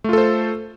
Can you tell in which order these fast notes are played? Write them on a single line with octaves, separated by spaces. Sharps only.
A3 F4 A4 C5